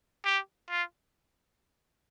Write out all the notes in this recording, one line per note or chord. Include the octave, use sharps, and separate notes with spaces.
G4
F4